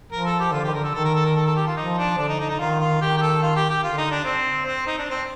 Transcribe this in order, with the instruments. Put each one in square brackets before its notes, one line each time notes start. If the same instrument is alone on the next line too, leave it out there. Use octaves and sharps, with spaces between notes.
[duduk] F3 [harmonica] A#4
[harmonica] A4
G4
[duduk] D3 [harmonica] F4
[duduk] D#3 [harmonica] G4
[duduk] D3 [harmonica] A#4
[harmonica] A4
[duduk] D#3 [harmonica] A4
[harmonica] A#4
A4
A#4
A4
A4
G4
F4
[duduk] F3 [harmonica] D#4
[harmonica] D4
[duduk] D3 [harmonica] D4
[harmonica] D#4
D#4
D#4
[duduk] D#3 [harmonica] F4
[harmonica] F4
[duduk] D#3 [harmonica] G4
[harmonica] G4
A4
F4
G4
G4
[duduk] D3 [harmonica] F4
[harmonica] D#4
D4
C4
C4
D#4
D4
C4